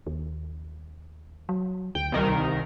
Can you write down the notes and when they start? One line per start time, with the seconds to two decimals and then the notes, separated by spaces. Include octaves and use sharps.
0.07 D#2
1.49 F#3
1.95 D2 G5
2.12 C2 D#3 A#4